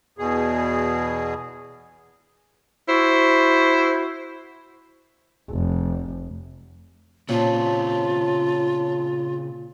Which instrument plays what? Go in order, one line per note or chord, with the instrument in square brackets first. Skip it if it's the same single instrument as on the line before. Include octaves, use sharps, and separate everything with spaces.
[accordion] E2 B2 G#4
[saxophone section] E4 F#4 C5
[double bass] F1
[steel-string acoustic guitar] A#2 [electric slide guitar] C#3 C4 [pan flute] F4 [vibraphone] C#5 A5